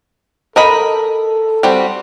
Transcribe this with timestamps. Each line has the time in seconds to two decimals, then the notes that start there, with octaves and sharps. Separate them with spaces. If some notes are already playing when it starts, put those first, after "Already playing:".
0.56 A4 A#4 D#5 B5
1.63 G3 C4 F#4